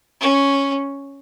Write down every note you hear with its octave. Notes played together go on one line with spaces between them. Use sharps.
C#4